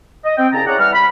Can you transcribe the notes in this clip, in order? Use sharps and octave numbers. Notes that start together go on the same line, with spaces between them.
D#5
C4 G5
C2 C#3 C#4 A5 A#5
E4 G#4 C#5 D5 F#5 A#5
E3 G3 F#5 F6
B5